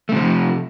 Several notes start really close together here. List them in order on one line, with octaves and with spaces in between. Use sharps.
A3 C3 F3